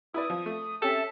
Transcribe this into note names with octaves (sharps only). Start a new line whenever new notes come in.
E4 B4 D5 D#6
F3
A3
C#4 G4 A4 E5 A5